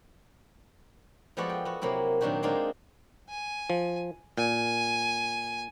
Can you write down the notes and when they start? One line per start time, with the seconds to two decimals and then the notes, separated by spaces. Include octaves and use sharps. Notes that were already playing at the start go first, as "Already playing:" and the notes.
1.37 F3 G#3 B3 F#4 A4 D5
1.49 G5
1.65 B3 F#4
1.82 C3 F#3 A#3 C4 E4
2.21 A#2 D#3 F#3 D4 F#4 G4
2.43 G#3 A#3 C4 D4 D#4 F4
3.29 G#5
3.70 F3
4.38 A#2 G#5